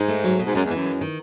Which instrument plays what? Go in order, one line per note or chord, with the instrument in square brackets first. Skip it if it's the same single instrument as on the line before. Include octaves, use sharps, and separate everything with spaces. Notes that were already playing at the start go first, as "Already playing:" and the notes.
Already playing: [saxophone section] G#2 [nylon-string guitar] D#4
[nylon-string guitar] A3
F#3
B2
[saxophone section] G#2
[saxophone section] F#2 [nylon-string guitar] G#3
[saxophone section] E2
[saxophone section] F#2 [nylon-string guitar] E3
[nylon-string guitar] G#3
D#3